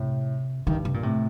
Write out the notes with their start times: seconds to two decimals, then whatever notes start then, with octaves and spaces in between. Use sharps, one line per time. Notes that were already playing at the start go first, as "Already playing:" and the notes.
Already playing: A2 C3
0.67 G2 D#3
0.85 C3
0.94 A#2
1.03 A2 C3